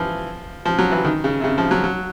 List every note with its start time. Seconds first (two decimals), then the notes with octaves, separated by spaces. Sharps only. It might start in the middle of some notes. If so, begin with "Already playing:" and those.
Already playing: E3 F3
0.65 F3
0.79 F#3
0.92 E3
1.05 D#3
1.24 C#3
1.40 C3
1.44 C#3
1.58 F3
1.71 F#3
1.84 F#3